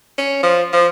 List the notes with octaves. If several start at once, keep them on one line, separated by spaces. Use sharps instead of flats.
C#4
F3
F3